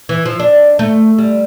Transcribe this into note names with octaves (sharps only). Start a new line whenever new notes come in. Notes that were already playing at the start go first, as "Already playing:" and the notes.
E3
F3
D4
A3
G3